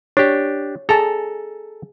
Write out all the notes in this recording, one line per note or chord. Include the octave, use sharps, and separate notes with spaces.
D4 G4 C#5
G#4 A4 A5 A#5